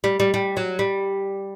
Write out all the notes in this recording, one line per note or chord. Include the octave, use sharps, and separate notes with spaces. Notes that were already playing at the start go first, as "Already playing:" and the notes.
G3
G3
G3
F#3
G3